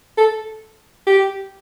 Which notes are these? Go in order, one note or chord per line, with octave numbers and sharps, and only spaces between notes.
A4
G4